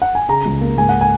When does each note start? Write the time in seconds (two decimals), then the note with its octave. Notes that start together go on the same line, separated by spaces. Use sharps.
0.02 F#5
0.15 G#5
0.28 C#3 A#5
0.46 C#2
0.61 A#3
0.77 G#2 G#5
0.89 F#5
1.01 G#5